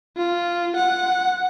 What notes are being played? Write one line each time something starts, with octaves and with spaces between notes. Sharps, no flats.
F4
F#5